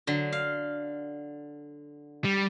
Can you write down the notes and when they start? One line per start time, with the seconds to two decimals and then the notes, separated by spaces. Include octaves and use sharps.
0.07 D3 F#3
0.32 F5
2.24 G3